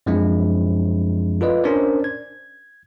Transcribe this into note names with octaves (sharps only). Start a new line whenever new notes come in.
F#2 F3 G#3 C4 D4 E4
F4 A4 B4 D5 D#5
C#4 D4 A#4 C5 D5
G#6